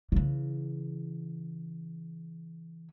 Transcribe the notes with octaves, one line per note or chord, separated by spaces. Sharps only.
C#3 E3